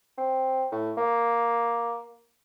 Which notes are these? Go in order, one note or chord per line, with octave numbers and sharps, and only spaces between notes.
C4
A2
A#3